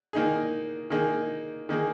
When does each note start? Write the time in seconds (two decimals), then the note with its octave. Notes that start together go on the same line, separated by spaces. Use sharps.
0.13 D#3 A#3 D#4 G#4
0.90 D#3 A#3 D#4 G#4
1.69 D#3 A#3 D#4 G#4